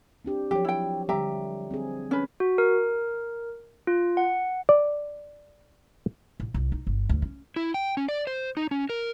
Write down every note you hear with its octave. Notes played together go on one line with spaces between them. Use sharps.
C4 D4 G4
F3 F#3 G4 C#5
E4 G5
D3 G3 G4 E5 A#5
C4 G#4
C#4 B4
F#4
A#4
F4
F#5
D5
A1
C2
D#4
G1
D2
C#4
E4
G5
C#4
D5
C5
D#4
C#4
A#4